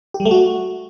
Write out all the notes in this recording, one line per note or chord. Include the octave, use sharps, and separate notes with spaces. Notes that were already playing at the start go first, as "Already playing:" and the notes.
G4
G3
A3
F#4